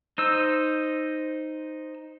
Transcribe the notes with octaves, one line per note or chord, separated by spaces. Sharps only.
D#4 C5 E6